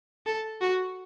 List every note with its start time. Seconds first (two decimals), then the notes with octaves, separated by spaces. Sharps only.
0.26 A4
0.61 F#4